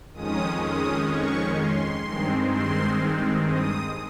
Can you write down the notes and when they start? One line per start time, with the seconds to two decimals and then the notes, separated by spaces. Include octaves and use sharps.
0.13 F2 D#3 G#3 C#4 D#6
0.62 D#6
1.09 C#6
1.57 C6
2.05 G2 D#3 G#3 C4
2.52 C6
3.48 D#6